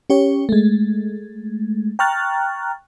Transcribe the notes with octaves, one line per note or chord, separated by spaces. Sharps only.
C#4 G4 C#5
G#3 A3
G5 A#5 C#6 F6 F#6 A6